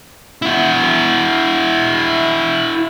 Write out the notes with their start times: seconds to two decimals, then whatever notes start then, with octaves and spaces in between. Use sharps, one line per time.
0.42 E4 F#4